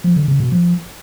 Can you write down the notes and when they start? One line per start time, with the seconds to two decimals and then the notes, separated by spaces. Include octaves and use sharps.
0.04 F3
0.16 D3
0.28 C#3
0.40 B2
0.52 F3